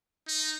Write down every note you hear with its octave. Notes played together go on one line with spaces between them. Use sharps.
D#4